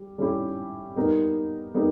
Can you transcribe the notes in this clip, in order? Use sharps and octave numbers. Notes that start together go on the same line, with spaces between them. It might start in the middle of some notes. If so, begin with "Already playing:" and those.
Already playing: G3
G3 C#4 E4 G4
G3 B3 D#4 A#4
G3 B3 D#4 A#4